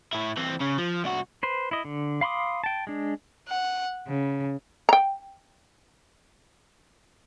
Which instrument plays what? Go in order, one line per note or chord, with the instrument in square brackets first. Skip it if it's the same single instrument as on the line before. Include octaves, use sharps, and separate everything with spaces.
[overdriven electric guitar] A2 E4
E3 C4
C#3
F3
C2 F#4
[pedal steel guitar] B4 C5
E4 D#5
D3
F5 B5 C6 D6 D#6
G5 A5
G#3 D4
[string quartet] F#5
C#3
[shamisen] G5 A#5